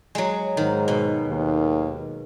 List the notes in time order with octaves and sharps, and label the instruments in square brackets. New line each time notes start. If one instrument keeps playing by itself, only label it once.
[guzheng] F#3 G#3
[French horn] G#2 [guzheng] D#3
[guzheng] B2
[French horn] D#2